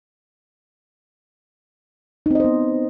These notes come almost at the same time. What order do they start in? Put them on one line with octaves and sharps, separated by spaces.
D#4 C4 D#5 C5 B3